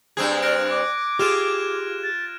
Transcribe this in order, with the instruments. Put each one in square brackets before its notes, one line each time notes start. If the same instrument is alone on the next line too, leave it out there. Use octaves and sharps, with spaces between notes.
[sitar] G2 C4 G#4 [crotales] G#6
[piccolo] F6 [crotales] F#6 A#6 D7
[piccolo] D6 [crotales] F#6
[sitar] F4 [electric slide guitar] G4 G#4 [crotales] F6 G#6 E7
[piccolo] A6